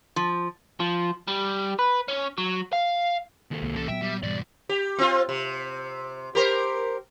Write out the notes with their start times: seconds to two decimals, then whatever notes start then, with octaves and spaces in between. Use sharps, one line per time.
0.16 F3
0.80 F3
1.28 G3
1.79 B4
2.08 C#4
2.38 F#3
2.73 F5
3.51 D#2 A4
3.62 C2 A#3
3.76 E3 C#4 A4
3.88 A#2 F#3 B3 E5 G5
4.02 G3
4.23 E2 G#2 B2 G3 D5
4.69 G4
4.99 C4 F4
5.29 C3
6.35 G4 A#4 C5